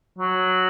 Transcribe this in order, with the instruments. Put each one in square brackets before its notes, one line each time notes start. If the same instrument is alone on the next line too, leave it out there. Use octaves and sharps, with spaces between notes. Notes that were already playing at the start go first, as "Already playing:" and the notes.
[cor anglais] F#3